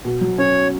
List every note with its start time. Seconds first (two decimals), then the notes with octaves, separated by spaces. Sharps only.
0.05 B2
0.21 F#3
0.38 C#4 C#5